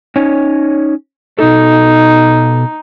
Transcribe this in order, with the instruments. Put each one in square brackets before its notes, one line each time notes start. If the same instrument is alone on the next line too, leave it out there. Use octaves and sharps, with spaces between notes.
[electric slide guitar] C#4 D#4 C#5
[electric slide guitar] B2 A4 [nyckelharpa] D#4